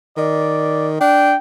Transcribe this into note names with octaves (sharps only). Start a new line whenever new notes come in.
D#3 D5
D4 G5